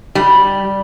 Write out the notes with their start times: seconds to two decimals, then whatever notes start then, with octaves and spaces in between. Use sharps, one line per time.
0.15 G3